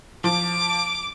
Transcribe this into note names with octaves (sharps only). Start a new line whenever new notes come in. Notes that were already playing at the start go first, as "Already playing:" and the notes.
F3 D6